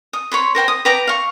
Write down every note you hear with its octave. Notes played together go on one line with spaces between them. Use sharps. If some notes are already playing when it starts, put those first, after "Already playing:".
D#6
C#5 B5 C6
A#4 C5 G5 G#5
D#6
B4 G5 A#5 D6
F5 C#6